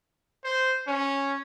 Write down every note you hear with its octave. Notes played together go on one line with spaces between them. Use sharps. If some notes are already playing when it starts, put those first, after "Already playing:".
C5
C#4